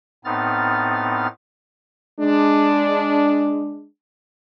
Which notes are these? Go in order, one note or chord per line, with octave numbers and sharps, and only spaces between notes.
A2 B3 C4 D#4 F6 A6
G#3 D4